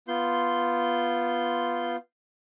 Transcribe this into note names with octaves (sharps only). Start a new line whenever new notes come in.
B3 F4 C6 G6